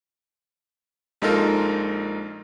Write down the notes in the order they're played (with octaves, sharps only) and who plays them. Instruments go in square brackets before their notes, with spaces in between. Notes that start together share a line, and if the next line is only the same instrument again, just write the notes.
[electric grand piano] A#1 G#3 D#4 F4 A4 A#4